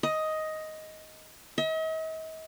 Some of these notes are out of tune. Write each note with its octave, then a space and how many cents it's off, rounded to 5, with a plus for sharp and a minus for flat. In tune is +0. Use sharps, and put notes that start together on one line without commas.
D#5 +10
D#5 +45